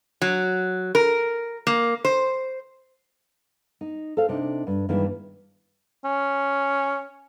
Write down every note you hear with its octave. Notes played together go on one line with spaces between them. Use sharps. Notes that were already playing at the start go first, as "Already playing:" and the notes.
F#3
A#4
A#3
C5
D#4
A4 C5 F5
C3 D4 D#4
G2
G2 D#3 E3 G#3 A#3 E4
C#4